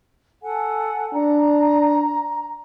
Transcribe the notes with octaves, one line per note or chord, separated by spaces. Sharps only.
A4 F#5 G#5
D4 A#5